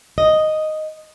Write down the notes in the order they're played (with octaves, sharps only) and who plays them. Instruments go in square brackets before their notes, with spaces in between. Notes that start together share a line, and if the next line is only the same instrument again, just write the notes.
[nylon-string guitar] D#5